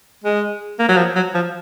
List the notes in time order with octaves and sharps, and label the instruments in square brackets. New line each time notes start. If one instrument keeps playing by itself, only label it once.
[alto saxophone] G#3
A#3
F#3
F3
F#3
F3